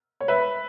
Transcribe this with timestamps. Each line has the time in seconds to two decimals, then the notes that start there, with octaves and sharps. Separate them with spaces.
0.20 C#5
0.28 B4 E5